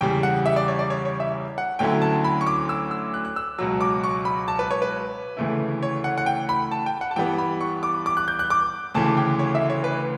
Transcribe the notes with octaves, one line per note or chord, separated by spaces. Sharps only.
E2 C#3 G3 G5
F#5
E5
D5
C#5
D5
C#5
C#5
E5
F#5
D2 D3 F#3 C#4 E4 G5
A5
B5
C#6
D6
E6
E6
F#6
F#6
E6
C#2 B2 F#3 E6
D6
C#6
B5
A5
B4
C#5
B4
D2 C#3 E3 A3 E4
C#5
F#5
F#5
G5
B5
A5
G5
F#5
A5
G2 E3 G3 B3 G5
B5
C#6
D6
D6
F#6
G6
F#6
D6
D2 C#3 E3 A5
G5
C#5
E5
C#5
B4